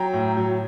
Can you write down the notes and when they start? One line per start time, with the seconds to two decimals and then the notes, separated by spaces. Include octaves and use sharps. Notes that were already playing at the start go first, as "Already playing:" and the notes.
Already playing: F#3 G5 A#5
0.13 A2
0.37 F#3